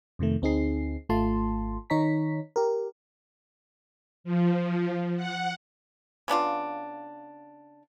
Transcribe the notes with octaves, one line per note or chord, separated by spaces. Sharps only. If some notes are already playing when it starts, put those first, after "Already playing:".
F2 C3 D#3 A3
D2 C4 D#4 G#4 C7
G#1 A3 F4 A5 C6
D#3 D#4 C#5 A#5 B6
G4 A#4
F3
F#5
C#3 B3 D4 F4